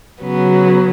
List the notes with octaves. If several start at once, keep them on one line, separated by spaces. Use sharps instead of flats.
C#3 F#3 B3